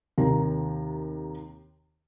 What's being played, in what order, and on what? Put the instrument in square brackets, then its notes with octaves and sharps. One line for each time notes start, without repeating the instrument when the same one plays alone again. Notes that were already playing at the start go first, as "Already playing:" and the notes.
[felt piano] D#2 C3 D#3 A#5